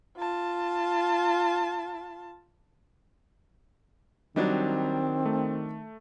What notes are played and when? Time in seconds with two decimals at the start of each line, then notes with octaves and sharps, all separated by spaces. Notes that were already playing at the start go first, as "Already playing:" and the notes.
0.18 F4 A5
4.36 D#3 F#3 G3 C4 D4 D#4
5.26 A3